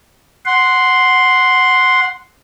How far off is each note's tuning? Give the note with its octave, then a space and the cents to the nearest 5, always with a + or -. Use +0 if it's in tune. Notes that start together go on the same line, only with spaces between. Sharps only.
F#5 -5 C6 +0